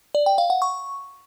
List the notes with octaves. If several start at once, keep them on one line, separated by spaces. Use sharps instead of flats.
D5
G5
F5
F#5
C#6